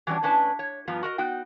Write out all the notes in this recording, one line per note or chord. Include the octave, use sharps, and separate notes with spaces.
E3 F#3 G3 A#3 C#4 D4
A2 C#4 D4 B4 A5
C#5
G2 F3 B3 F4 A#5
F#4 A#4 D#5
B3 D#4 F#4 G5